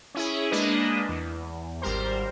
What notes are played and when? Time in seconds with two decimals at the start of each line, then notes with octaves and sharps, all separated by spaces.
0.15 C#4 E4 G#4
0.51 G#3 A#3 D4 B4 D#5
1.09 E2
1.82 G#1 G3 A#4 C5